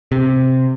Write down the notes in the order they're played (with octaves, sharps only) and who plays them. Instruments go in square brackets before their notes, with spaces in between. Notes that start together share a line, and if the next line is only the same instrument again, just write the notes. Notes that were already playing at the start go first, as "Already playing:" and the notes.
[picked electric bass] C3